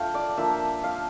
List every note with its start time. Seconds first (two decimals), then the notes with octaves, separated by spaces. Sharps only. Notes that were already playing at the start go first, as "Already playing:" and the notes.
Already playing: A3 D4 F4 F5 G5
0.14 D5
0.37 F3 A#3 D4 E5
0.84 F5